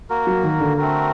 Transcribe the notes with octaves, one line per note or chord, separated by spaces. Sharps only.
A#3 F#4 A#4
F#3
D#3
D3
A3 C4 F#4 A#4